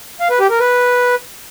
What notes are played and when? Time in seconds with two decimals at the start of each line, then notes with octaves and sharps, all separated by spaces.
0.20 F5
0.30 B4
0.40 G4
0.50 A#4
0.60 B4